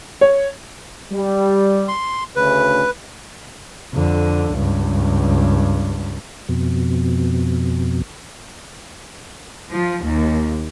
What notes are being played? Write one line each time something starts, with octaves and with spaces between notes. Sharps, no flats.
C#5
G3
C6
D2 C#3 B4
F2 D3
C#2 G2
F2 B2
F3
D#2